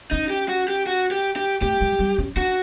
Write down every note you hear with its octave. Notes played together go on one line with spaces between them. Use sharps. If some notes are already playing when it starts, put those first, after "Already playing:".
C#4 D#4
G4
F#4
G4
F#4
G4
G4
A3 G4
G#3
G3
C#4
D4 F#4